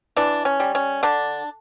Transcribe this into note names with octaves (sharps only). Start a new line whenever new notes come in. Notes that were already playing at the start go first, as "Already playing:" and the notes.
E3 D4
C#4
G3
C#4
D3 D4